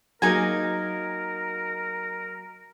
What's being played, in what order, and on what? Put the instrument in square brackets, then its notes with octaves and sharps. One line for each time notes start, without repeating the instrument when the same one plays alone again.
[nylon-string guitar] F#3 A#3 [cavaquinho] D#4 G#4 G#5 [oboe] A#4